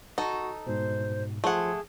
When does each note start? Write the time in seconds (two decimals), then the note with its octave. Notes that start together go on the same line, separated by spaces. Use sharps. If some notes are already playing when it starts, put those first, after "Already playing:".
0.18 D#4 F#4 A4 C#6
0.67 G#2 B2 C5
1.44 F3 A3 G#4 F#5 C6